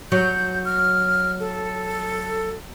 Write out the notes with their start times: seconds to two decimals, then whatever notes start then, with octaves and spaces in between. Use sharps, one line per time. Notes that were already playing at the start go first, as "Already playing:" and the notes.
0.12 F#3 G6
0.65 F6
1.40 A4